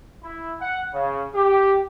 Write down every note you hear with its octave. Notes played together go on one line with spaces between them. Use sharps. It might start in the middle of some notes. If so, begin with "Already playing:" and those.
E4
F#5
C#3
G4